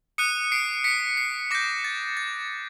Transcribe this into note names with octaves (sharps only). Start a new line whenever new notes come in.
D#6 F#6 C#7 D#7
C7 D7
B6 C#7
C7
D6 G6 A#6
A6
A6